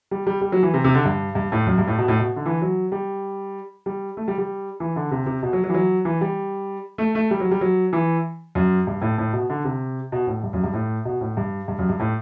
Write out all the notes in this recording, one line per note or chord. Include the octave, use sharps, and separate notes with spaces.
G3
G3
G3
F#3
E3
C3
C3
D3
G2
G2
A2
F#2
G2
A2
B2
A2
B2
D3
E3
F#3
G3
G3
A3
G3
G3
E3
D3
C3
C3
B2
F#3
F#3
E3
F#3
E3
G3
A3
A3
G3
F#3
G3
F#3
E3
F#2
G2
A2
A2
B2
D3
C3
B2
A2
G2
F#2
G2
A2
B2
A2
G2
G2
F#2
G2
A2